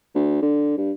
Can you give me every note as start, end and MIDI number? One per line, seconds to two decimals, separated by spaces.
0.15 0.39 38
0.42 0.75 50
0.77 0.92 43